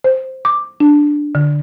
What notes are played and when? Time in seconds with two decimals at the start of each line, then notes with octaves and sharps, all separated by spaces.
0.04 C5
0.45 D6
0.80 D4
1.35 D3